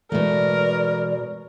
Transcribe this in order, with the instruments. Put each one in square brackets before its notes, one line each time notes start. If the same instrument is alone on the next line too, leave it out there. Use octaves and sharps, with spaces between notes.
[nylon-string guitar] B2 A3 [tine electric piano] E3 G#3 [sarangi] A#4 [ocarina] D5